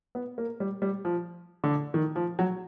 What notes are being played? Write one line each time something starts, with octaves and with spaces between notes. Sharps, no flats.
B3
A#3
G3
G3
F3
D3
D#3
F3
F#3